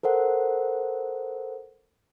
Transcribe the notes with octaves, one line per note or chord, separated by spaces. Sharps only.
A4 A#4 C5 F#5